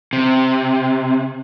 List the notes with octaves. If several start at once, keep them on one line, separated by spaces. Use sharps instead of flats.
C3